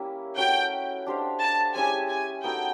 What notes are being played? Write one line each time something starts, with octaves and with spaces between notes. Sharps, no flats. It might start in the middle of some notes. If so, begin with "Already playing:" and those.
Already playing: G3 A#3 C#4 E4
A3 C#4 F#4 B4 G5
D4 G4 C5 F5
A5
G#3 C#4 E4 G4 G#5
G#5
B3 D#4 F#4 A4 G5